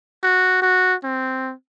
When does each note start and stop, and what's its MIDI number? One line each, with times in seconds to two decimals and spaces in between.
0.23 0.61 66
0.62 0.94 66
1.04 1.53 60